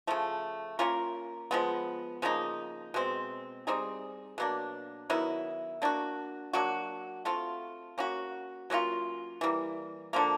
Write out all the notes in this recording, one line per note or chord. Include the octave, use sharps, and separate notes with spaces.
C#3 F3 A3
A#3 C#4 F4 A#4
F3 G#3 B3
C#3 F3 A#3 D#4
B2 G#3 C4
G3 C4 D#4 G#4
B2 F#3 A#3 D4
D#3 F#3 B3 E4
A#3 D4 F#4
F#3 A#3 D4 F#4
A3 C4 F4
A#3 C#4 F#4
F#3 A#3 C#4 F4
E3 G3 A#3
D3 F3 A#3